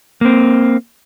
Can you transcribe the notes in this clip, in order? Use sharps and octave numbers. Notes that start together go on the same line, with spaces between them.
A#3 C4